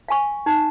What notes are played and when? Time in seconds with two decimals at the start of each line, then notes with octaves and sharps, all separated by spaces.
0.08 F5 G#5 C#6
0.46 D#4